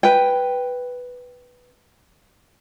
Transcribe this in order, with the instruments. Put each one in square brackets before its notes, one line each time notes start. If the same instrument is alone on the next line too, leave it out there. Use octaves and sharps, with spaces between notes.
[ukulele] B4 G5